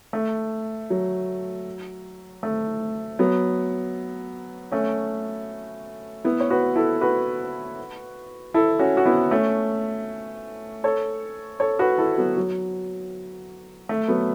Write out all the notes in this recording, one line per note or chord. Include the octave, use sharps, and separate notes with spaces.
A3
F#3
A3
F#3 B3
A3 C#4
B3 E4
C#5
F#4 B4
E4 A4
F#4 B4
E4 A4
C#4 F#4
F#4
B3 E4
A3 C#4
A4 C#5
A4 C#5
F#4 B4
E4 A4
F#3 B3
F#3
A3
F#3 B3